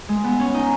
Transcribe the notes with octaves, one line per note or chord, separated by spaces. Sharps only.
G#3
B3
C#4
D#4